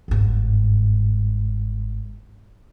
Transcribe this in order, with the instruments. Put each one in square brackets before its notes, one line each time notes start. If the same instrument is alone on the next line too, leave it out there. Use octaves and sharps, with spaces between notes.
[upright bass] G1 G#2